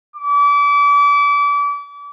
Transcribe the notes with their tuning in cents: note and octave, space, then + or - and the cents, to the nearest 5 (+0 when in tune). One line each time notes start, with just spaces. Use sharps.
D6 -35